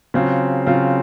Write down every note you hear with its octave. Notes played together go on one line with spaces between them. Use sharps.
C#3 F#3 C4 F4
C#3 F#3 C4 F4